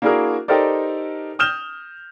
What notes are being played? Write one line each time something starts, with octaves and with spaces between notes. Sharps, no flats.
A#3 D4 E4 F#4 G#4 A#4
D#4 G4 A4 A#4 C5 D5
D#6 F6 G6 E7 G7